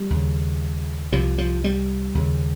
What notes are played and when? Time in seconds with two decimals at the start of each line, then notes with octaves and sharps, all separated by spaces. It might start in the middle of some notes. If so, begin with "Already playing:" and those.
Already playing: G3
0.10 D#2 C#3
1.12 C2 C3 F3
1.38 F3
1.64 G3
2.15 D#2 C#3